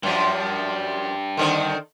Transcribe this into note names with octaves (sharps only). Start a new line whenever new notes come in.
F#2 F3 G3 D4
D3 D#3 C4